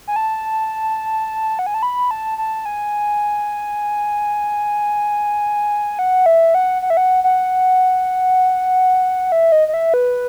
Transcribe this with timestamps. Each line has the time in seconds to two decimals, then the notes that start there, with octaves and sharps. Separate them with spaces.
0.08 G#5
0.16 A5
1.59 F#5
1.66 G#5
1.74 A5
1.83 B5
2.11 A5
2.38 A5
2.65 G#5
5.99 F#5
6.26 E5
6.55 F#5
6.82 F#5
6.90 E5
6.97 F#5
7.24 F#5
9.32 E5
9.52 D#5
9.68 D#5
9.74 E5
9.94 B4